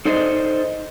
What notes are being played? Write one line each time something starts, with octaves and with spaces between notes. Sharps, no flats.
D#4 A4 C5 D5 D#5